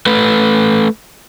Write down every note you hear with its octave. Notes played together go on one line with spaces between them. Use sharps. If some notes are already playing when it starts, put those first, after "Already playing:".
A3 B4